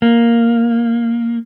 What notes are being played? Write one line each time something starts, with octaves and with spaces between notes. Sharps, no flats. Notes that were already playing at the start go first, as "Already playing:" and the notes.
A#3